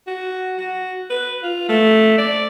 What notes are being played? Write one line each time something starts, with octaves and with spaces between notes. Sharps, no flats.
F#4
F#4
B4
F4
A3
D5